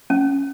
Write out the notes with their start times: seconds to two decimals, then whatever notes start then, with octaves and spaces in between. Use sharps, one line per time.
0.10 C#4